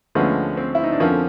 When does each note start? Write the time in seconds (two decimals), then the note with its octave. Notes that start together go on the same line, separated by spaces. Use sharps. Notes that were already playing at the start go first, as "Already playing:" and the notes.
0.15 D2 D3 F3 G#3 B3 C#4
0.57 C4
0.75 E4
0.84 D#4
0.92 D4
1.00 F2 D3 F3 A#3 C#4